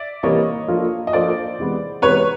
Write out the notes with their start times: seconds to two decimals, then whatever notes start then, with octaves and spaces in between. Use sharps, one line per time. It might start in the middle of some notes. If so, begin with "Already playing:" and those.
Already playing: D5 E5
0.23 C3 E3 G3 A#3 C#5 D#5
0.68 F3 A#3 D4 F4 A4
1.07 D#5
1.13 F3 A#3 D4 F4 A4 C5 D5
1.58 C3 E3 G#3 B3
2.02 C3 E3 G#3 B3 B4 C#5